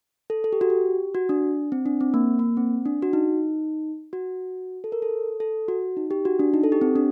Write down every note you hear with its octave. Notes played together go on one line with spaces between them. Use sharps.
A4
A4
G4
F#4
G4
F#4
D4
C4
D4
C4
A#3
A#3
C4
D4
F#4
D#4
F#4
A4
A#4
A4
A4
F#4
D#4
G4
F#4
D4
D#4
A4
G4
C4
D4